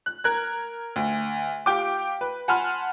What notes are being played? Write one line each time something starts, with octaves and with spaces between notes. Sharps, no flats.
F#6
A#4 F#6 G#6
D2
F4 G4 G5 D6
B4
F#5 G#5 A5 B5 C6 F6